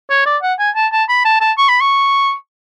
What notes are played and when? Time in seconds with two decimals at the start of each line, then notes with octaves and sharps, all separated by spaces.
0.10 C#5
0.26 D5
0.42 F#5
0.59 G#5
0.76 A5
0.92 A5
1.09 B5
1.25 A5
1.41 A5
1.58 C#6
1.69 B5
1.81 C#6